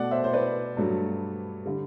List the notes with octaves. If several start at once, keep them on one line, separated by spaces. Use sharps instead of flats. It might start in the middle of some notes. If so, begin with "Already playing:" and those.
Already playing: B2 A3 D5 F#5
C5 E5
C5
B4 D5
G2 F#3 A3
D3 G3